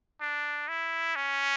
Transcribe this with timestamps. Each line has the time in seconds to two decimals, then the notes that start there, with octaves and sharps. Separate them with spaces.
0.21 D4
0.68 E4
1.16 C#4